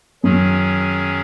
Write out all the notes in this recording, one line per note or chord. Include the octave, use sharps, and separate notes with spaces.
F#2 D#3 F#3 C#4 G#4